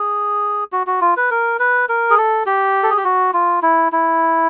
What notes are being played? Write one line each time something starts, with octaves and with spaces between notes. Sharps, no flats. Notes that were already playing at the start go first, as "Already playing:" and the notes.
Already playing: G#4
F#4
F#4
F4
B4
A#4
B4
A#4
G#4
A4
G4
A4
G#4
G4
F#4
F4
E4
E4